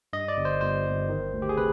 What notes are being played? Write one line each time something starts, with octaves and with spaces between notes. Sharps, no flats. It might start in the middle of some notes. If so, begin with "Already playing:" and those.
G2 D#5
D5
G1
C5
G1 C5
G1
D#3
D2
G4
G#4
C3 B4